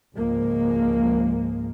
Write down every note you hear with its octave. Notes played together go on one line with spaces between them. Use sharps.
C#2 G#2 F3 G#3 A#3